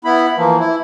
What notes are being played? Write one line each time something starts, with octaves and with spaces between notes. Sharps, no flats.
B3 E4 B5
E3 F3 A#3
E4